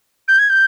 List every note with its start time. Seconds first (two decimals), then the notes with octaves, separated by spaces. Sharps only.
0.28 G6
0.39 G#6
0.49 G6